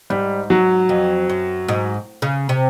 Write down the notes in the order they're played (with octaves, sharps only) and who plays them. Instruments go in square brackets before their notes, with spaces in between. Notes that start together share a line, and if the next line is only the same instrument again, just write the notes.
[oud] G#2 [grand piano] G3
[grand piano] F#3
[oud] F2
F#2
G#2
C#3
C3